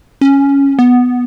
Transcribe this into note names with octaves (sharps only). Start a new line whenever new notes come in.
C#4
B3